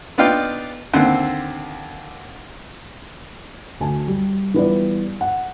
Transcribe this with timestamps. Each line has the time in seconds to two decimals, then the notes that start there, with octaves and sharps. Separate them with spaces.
0.18 B3 D4 D#4 F4 F5 G5
0.94 D#2 D3 C4 F#5
3.80 D2 G#5 A5
4.08 G3
4.54 E3 G3 B3 E4 F4 D5
5.21 F#5